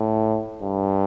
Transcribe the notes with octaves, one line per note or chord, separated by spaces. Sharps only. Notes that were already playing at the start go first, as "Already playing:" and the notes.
Already playing: A2
G2